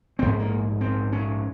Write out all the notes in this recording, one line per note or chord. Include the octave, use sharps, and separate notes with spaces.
A#1 G#2 C4
A#3
C4
C#4